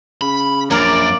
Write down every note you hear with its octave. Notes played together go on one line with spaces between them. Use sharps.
C#3 B5
A#1 F#2 A#3 A#4 D5